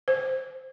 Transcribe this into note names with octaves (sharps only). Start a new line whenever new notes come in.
C5